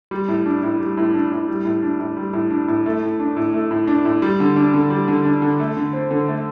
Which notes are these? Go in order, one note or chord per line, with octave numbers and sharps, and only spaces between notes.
G3
A2
D4
A2
G3
A2
D4
A2
G3
A2
D4
A2
G3
A2
D4
A2
A3
A2
D4
A2
A3
A2
D4
A2
G3
D3
D4
D3
G3
D3
D4
D3
A3
D3
C4
D3
A3